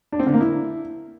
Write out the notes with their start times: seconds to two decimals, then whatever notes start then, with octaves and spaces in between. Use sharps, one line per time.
0.12 D4
0.19 C4
0.27 D3
0.34 A#3
0.41 E4